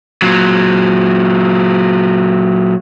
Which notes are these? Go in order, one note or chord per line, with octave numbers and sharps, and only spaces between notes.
A#2 F#3